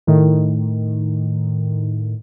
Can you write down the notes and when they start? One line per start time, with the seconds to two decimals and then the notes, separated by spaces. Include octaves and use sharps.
0.07 A2 D#3